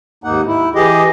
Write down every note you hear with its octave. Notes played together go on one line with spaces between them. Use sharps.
D#2 G#2 A#3 D#4 F#5
E4
E3 G4 G#4 D#5